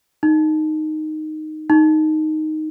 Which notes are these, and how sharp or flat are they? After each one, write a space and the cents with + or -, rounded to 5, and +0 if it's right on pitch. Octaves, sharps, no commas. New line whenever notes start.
D#4 -5
D#4 +0